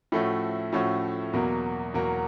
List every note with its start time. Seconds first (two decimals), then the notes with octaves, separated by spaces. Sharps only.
0.12 A2 F3 A3 C#4 F#4
0.73 A2 F3 A3 C#4 F#4
1.33 E2 B2 F#3 A#3
1.94 E2 B2 F#3 A#3